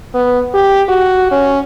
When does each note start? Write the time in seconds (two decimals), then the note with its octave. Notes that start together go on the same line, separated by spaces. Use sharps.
0.14 B3
0.54 G4
0.89 F#4
1.31 C#4